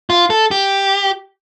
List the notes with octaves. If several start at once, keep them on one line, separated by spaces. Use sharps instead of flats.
F4
A4
G4